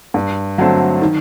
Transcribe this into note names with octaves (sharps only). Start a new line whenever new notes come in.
G2
D3 F#3 A3 C4
D#3